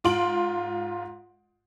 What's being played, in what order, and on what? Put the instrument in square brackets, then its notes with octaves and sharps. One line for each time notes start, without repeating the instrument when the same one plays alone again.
[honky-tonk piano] G#2 F4 C6 D7 F#7